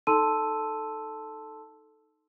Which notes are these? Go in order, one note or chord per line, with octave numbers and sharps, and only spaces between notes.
D#4 A4 A5 C6 E6 D#7